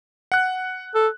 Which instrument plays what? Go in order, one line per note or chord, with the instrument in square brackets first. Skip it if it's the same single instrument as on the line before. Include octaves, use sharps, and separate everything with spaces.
[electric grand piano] F#5 F#6
[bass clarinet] A4